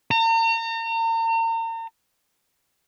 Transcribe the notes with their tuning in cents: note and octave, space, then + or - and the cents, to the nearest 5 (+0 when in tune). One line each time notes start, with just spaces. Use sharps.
A#5 -40